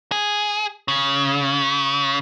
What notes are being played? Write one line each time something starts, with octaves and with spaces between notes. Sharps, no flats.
G#4
C#3